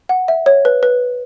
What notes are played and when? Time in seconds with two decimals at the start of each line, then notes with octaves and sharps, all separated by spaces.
0.09 F#5
0.28 E5
0.46 C#5
0.65 B4
0.83 B4